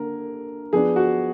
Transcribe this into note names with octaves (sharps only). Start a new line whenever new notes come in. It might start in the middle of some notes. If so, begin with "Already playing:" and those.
Already playing: D3 A#3 A#4
F3 B3 D4 G#4
F#4